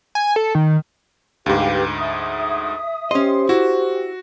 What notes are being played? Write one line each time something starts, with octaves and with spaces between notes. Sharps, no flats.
G#5
A4
D#3
D2 G#2 G4 B4 F5
E5 D#6
C#4 G4 C5 D#5 C6
E4 F#4